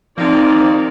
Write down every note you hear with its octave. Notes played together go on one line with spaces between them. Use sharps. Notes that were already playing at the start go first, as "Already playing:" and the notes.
C3 D#3 F3 A#3 C4 D#4 D5